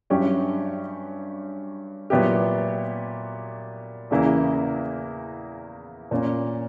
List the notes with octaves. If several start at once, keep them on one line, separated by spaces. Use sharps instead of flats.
G2 F#3 C#4 E4 G4
A#2 F#3 B3 E4 G4
E2 C#3 E3 A#3 E4
A#2 A#3 C#4